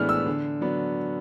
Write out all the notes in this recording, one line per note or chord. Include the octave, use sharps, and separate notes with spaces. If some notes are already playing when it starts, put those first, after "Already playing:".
Already playing: A2 E3 G#3 B3 D4 F6
E6
D3
F#3 B3 D4